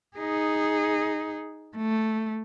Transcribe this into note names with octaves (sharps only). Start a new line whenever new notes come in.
D#4 G#4
A3